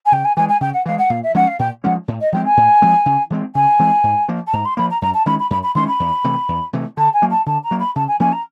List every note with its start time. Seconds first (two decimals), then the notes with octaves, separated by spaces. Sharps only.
0.05 G#5
0.12 C#3 G5
0.24 G#5
0.36 E3 G#3 G#5
0.48 G#5
0.61 C#3 G5
0.73 F#5
0.86 E3 G#3 F5
0.98 F#5
1.10 A#2 F5
1.23 E5
1.34 F3 G#3 C#4 F#5
1.47 F5
1.59 A#2 G5
1.84 F3 G#3 C#4 F#5
2.08 A2
2.20 D#5
2.32 F3 G#3 C4 G5
2.45 G#5
2.57 A2
2.82 F3 G#3 C4
3.06 C#3
3.30 E3 G#3 C4
3.55 C#3 G#5
3.79 E3 G#3 C4
4.03 G#2
4.28 F3 A#3
4.46 A5
4.53 G#2 A#5
4.65 C6
4.77 F3 A#3 B5
4.90 A#5
5.01 F#2 A#5
5.14 A5
5.26 D#3 G#3 C#4 B5
5.39 B5
5.50 F#2 B5
5.63 B5
5.75 D#3 G#3 C#4 C6
5.87 B5
6.00 E2
6.24 C3 E3 A3
6.49 E2
6.73 C3 E3 A3
6.97 D3 A5
7.13 G#5
7.22 F#3 A#3
7.30 A5
7.46 D3 A5
7.63 A#5
7.71 F#3 A#3
7.79 B5
7.95 C#3 A5
8.07 G#5
8.20 F3 A#3 C#4 G#5
8.32 A#5